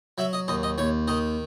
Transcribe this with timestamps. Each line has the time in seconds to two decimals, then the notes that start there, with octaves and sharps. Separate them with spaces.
0.18 F#3 E5
0.33 D#5
0.48 D#2 D#5
0.63 D#5
0.78 D#2 C#5
1.08 D#3 D#5